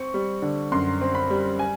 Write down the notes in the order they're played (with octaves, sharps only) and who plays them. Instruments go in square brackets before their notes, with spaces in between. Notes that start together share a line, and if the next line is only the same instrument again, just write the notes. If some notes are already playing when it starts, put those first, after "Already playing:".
Already playing: [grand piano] C4 C#6
G3
D3
F#2 C6
C4
B5
G3
G#5